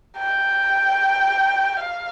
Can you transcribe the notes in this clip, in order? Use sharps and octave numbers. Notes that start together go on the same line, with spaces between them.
G5
F5